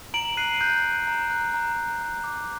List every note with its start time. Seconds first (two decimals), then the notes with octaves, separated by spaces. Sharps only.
0.14 A#5 D7 F#7
0.37 F#6 C7 D#7
0.61 F#6 G6
0.84 A#5
1.07 A#5
1.31 F#6
1.54 A#5
1.77 A#5
2.01 F#6
2.24 D6